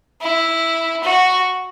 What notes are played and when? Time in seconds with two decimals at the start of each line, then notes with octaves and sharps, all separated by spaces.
0.22 E4
1.04 F#4